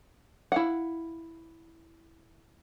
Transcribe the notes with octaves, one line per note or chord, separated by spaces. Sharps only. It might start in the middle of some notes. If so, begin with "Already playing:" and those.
E4 F5 F#5